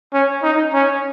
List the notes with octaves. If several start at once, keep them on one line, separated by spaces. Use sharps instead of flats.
C#4
D#4
C#4